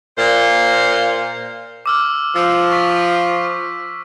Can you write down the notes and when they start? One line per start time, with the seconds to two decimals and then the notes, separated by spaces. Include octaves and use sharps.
0.18 A#2 C5 F5
1.86 D6 E6 F6
2.36 F3 E6
2.72 C#6 B6